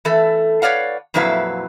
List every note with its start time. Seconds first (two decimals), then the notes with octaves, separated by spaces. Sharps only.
0.05 E3 A3 A4
0.62 B4 C#5 D5 F5 F#5
1.14 F2 A#2 F#3 E4 B4 F5